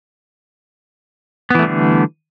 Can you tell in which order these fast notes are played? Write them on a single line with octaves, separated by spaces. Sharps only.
B3 E3 A3 G3 D3